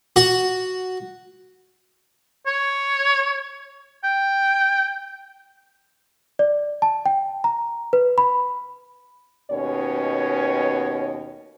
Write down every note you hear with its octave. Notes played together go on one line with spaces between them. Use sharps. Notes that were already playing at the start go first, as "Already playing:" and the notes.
F#4
C#5
G5
D5
A5
G5
A#5
B4
B5
D#2 B2 B3 C#4 C#5